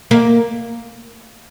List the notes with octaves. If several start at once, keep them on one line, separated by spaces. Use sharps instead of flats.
A#3